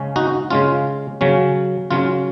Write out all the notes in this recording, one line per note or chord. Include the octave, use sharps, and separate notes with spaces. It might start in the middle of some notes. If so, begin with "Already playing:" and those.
Already playing: C#3 G#3 C#4
D#4 F#4
C#3 G#3 C#4 F4
C#3 F#3 C#4
C#3 F#3 C#4 F4